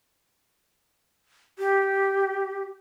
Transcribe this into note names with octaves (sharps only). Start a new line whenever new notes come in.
G4